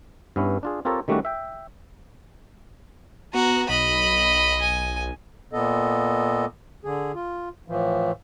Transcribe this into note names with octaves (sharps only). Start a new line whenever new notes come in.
G2 B3 C#4 E4
D4 F4 G#4
C4 F4 G4 A4 A#4 C#5
D#3 G3 A3 C#4 D4 F#4
E5 G5
B3 F#4 A#5
B1 D#5 B5
G#5
A#2 B3 A4 D#5
D3 G#4
F4
A2 E3 F3